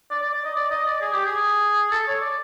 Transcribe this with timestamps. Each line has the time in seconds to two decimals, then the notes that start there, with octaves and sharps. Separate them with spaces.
0.11 D5
0.22 D5
0.33 D5
0.45 D#5
0.56 D5
0.71 D#5
0.86 D5
1.01 G#4
1.13 G4
1.25 G#4
1.91 A4
2.07 C#5
2.21 D5